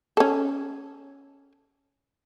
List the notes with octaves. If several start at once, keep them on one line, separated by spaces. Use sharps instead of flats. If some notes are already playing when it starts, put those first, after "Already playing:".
C#4 A4